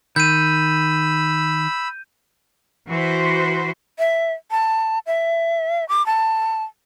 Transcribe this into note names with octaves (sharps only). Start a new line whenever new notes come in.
D#3 B5 E6 G6 D#7
E3 F#4 B4 C5
E5
A5
E5
D6
A5